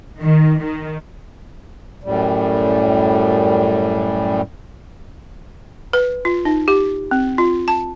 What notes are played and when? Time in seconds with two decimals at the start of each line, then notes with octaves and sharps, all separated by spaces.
0.21 D#3
0.60 D#3
2.04 F#2 A2 G3
5.93 B4
6.25 F4
6.45 D#4
6.68 G4
7.11 C4
7.38 F4
7.68 A5